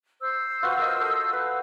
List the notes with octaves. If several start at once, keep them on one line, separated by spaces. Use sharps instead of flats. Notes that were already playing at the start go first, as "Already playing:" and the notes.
C5 E6
F4 F#4 B4
A#4 D#5
A4
B4